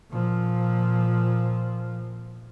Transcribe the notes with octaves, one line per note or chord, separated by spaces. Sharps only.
A#2 F3